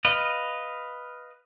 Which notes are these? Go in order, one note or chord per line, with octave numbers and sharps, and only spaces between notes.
B4 D#5 F5